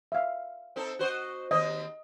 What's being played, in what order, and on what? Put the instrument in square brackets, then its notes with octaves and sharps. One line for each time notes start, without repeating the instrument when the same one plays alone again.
[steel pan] E5 F5
[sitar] C4 D#4 A4
F#4 C5 D#5
[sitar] D#2 C4 [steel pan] D#5